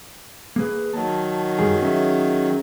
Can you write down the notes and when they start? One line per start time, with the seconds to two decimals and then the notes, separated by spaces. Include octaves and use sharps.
0.56 A#3 G#4 B4
0.94 D#3 F#3 A5
1.59 F#2 G3 G#4
1.82 C#4 G#4 E5